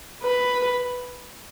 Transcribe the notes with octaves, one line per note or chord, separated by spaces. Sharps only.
B4